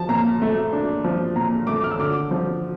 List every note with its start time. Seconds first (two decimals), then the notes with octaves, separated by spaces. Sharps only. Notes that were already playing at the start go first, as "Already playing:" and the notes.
Already playing: F3 A5
0.09 A#2 A#5
0.42 A3
0.73 D4
1.04 F3
1.36 A#2 A#5
1.67 A3 D6
1.84 F6
1.91 E6
1.99 D3 D6
2.31 F3